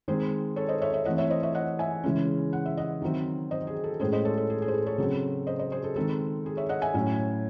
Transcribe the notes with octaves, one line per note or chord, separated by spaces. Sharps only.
D#3 G#3 C4 G#4 C5
A4 C#5
C5 D#5
C#5 E5
C#5 E5
E3 A3 C4 D#5 F#5
C#5 E5
C5 D#5
C#5 E5
D#5 F#5
E5 G#5
C#3 E3 G#3 C#4
F#5
E5
D#5 F#5
D#3 F#3 C4
C5 D#5
G#4
A4
A2 G#3 C#4 G#4 C5
C5 D#5
A4 C#5
A4
G#4
G#4
C5
A4
A4 C#5
C#3 F#3 C4
C5 D#5
C5 D#5
G#4 C5
A4
D#3 G#3 C4 A4
G#4
C#5 E5
D#5 F#5
E5 G#5
A2 F#3 C#4